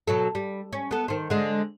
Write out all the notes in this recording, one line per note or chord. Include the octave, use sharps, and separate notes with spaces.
B2 F#3 A4
G3
C#4
B3 A4
D#3 C5
D3 G#3